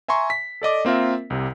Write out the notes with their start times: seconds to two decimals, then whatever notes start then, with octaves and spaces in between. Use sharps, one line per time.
0.08 E5 G#5 A#5 C6 C#6
0.30 B6
0.62 A4 D5 D#5 D6
0.85 A#3 C4 F4 A#4 E5
1.30 C2 C3